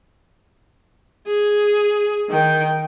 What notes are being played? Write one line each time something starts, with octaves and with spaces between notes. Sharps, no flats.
G#4
D#3 G5